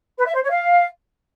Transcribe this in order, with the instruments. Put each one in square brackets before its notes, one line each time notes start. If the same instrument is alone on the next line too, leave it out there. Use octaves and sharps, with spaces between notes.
[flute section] B4
E5
C5
C#5
F5